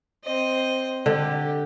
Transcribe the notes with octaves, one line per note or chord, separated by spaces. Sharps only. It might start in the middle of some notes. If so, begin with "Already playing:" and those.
C4 D#5
D3 G4